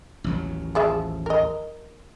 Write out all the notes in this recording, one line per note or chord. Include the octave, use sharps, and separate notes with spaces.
A1 D#2 F#3
F3 G#4 E5
A#4 D#5